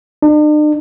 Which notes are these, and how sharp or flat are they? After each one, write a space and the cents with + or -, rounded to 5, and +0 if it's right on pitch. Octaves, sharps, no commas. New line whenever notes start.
D4 +45